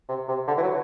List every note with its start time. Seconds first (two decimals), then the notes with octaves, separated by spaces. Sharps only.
0.09 C3
0.28 C3
0.47 D3
0.58 E3
0.62 F#3